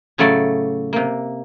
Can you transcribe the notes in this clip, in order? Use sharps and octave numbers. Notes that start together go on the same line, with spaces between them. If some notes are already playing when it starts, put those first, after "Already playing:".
A2 C#3 F#3 A3 D5
C3 A#3